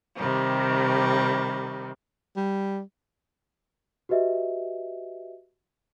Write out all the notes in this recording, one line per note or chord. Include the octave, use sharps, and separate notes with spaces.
C3 D#3 G3
G3
F#4 G4 B4 D#5 E5